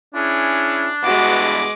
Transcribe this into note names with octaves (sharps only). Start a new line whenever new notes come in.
C#4 D4 E4 G#4
E2 G2 B2 G#3 F#4 D6